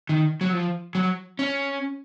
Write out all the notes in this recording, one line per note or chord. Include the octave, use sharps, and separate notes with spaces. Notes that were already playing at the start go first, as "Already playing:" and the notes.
D#3
F#3
F3
F#3
C#4